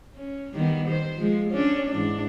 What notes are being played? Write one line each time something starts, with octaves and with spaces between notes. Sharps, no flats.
C#4
D#3 G3 B3
D#3 C5
F3 G#3
C#4 D4
G#2 E3 D4